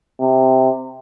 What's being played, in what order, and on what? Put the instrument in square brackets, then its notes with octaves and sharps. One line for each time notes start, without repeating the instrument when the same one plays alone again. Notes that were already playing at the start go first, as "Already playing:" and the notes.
[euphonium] C3